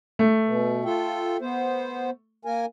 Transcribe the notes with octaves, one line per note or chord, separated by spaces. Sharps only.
A3
B2
F4 A4 G5
B3 C5
A#3 A#4 G#5